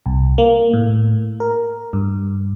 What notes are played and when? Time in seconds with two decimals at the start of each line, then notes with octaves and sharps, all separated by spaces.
0.06 C2
0.38 A#3
0.74 A2
1.40 A#4
1.93 G2